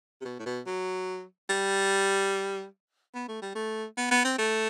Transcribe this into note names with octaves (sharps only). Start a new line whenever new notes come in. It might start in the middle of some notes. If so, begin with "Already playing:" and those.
C3
B2
A2
B2
F#3
G3
B3
A3
G3
A3
B3
B3
C4
A3